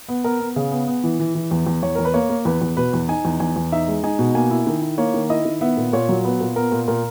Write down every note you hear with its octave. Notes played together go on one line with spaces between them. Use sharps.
B3
B3 A#4
B3
C#3 G#4
B3
B3
E3
E3
E3
E2
E2
E2 C#5
E2 A#4
B4
A#3 C#5
A#3
E2 B4
E2
B2 B4
E2
D#4 G#5
E2
E2 G#5
E2
D#4 E5
G#3
D#4 G#5
B2
A#3 G#5
E4
D#3
E4
A#3 C#5
D#3
E4 D#5
D#3
B3 E5
A#2
A#2 C#5
F#3
B3 B4
A#2
B3 A#4
A#2
A#2 A#4